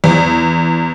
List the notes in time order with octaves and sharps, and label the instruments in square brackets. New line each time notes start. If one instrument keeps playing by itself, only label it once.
[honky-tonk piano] E2